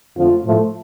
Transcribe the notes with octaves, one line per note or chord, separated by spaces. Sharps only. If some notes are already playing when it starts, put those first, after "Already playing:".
F2 D3 F3 A3 F4
A2 F3 A3